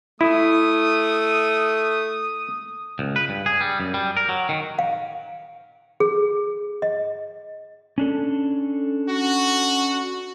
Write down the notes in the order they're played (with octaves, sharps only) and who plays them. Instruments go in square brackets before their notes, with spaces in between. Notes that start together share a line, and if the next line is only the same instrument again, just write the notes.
[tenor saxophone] A3 [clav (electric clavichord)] E4 [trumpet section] D#6
[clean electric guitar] C#2
B4
G2
G#4
G3
F#2
G3
A#4
F#3
D#3
[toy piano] F5
G#4
D#5
[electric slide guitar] C#4 D4 A4
[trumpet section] F#4